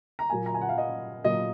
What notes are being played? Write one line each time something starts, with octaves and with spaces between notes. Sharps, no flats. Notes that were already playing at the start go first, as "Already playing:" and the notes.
A#5
A#2 F#3 A#3 G#5
A#5
G#5
F#5
F5
D#5
A#2 F#3 A#3 D#5